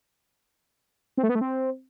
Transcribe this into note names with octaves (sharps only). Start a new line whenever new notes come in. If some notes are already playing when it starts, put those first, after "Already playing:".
C4
A3
B3
A3
C4